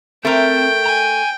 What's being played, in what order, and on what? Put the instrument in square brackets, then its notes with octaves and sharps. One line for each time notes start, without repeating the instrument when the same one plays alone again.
[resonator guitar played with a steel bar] A3 A#4 [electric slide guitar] C4 [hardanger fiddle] G5
[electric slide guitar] G#5 A#5